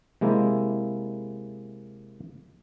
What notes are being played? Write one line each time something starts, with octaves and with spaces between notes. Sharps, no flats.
C3 G#3 A#3 E4